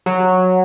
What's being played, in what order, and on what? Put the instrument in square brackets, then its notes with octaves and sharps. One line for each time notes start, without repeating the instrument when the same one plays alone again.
[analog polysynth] F#3